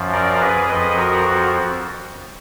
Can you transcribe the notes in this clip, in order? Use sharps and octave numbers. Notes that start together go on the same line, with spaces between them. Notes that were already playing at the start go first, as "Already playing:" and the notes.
Already playing: F#2 F3
A#4 D5
G#4 B4
F2 F3 B4 D#5
F#4 A#4
F#4